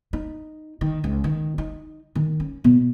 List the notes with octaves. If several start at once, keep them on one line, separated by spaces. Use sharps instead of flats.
D#4
D#3
C#2
D#3
D#4
D#3
C#4
B2